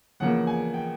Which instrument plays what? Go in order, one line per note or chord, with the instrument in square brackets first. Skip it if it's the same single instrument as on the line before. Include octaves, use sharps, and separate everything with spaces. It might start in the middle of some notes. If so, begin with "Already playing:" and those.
[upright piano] E2 C#3 F3 A#3 F#5
G#5
G5